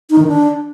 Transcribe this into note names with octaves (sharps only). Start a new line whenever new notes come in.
D#4
D#3
D4